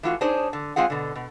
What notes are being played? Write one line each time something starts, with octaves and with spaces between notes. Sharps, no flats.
E3 A3 F4 F#4
D4 D#4 G#4 C5 C#5
D3
G#3 C4 F4 G#4 F#5
B2 D3
B2